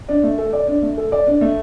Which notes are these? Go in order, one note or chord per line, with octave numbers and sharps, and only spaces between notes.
D4
A3
A4
D5
D4
A3
A4
D5
D4
A3